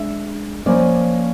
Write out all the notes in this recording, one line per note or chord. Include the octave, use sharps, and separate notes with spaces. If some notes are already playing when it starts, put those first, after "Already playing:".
Already playing: G#3 D4 E5
F3 A#3 C#4 D5